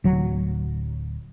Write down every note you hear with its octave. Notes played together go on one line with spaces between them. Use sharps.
D1 F#3